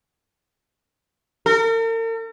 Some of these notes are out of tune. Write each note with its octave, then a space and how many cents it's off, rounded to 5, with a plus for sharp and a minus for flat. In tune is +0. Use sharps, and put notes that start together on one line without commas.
A#4 -45